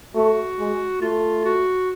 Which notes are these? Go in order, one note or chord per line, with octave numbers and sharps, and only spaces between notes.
A3 F#4
G#3
A3 F4
F#4